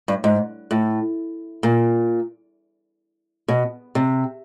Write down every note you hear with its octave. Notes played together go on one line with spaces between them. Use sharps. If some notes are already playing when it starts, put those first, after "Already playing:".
G2
G#2
A2
A#2
B2
C3